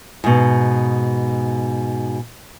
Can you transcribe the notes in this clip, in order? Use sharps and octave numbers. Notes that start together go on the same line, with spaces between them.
G#2 B2